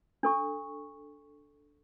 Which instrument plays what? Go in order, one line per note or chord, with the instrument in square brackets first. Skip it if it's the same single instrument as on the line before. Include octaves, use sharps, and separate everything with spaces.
[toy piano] D4 A4 C#6